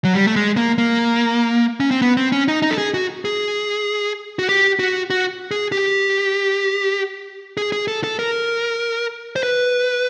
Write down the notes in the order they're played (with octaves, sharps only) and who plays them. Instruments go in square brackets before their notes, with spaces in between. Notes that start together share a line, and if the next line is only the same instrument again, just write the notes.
[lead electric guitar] F#3
G3
A3
G#3
A#3
A#3
C#4
C4
B3
C4
C#4
D#4
D#4
A4
G#4
F#4
G#4
F#4
G4
F#4
F#4
G#4
G4
G#4
G#4
A4
A4
A#4
C5
B4